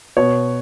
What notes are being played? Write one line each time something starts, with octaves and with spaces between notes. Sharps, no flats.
B2 C#5